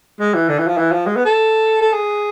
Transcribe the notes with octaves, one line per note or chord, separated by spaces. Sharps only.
G#3
E3
D3
E3
F3
E3
F3
G#3
B3
A4
A4
G#4